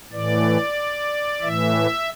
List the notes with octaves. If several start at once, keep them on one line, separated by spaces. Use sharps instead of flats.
A2 E3 D5
A2 E3 E5